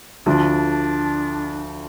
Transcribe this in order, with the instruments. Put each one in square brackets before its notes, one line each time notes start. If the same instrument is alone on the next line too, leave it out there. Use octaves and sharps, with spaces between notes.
[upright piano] D2 D3 F3 [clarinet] D4